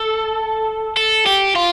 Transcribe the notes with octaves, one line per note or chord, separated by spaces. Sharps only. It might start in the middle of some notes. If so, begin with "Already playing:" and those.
Already playing: A4
A4
G4
F4